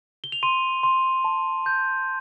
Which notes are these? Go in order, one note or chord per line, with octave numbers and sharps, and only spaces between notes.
G7
F7
C6 D#7
C6
A5
G6